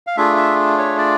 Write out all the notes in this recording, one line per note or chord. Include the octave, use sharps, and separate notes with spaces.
F5
A3 D4 F4 G#4 E5
E5
C#5
D5